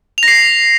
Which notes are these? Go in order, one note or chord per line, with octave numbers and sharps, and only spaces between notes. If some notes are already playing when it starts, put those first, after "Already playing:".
A#6 C7 F7